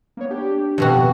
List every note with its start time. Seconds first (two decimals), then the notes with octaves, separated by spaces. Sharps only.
0.17 A#3 B3 C#5
0.30 D4 G4
0.78 F2 B2 F#4